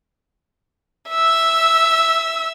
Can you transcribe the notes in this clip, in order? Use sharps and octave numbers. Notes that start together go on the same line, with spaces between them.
E5 E6